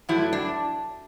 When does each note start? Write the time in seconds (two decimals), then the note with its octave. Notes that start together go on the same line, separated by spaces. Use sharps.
0.09 G2 F#3 A3 E4
0.33 D4